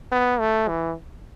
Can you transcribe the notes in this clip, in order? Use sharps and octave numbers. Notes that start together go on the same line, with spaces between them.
B3
A3
E3